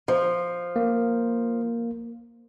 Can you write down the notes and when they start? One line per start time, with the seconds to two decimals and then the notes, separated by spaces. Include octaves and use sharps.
0.08 F3
0.76 A#3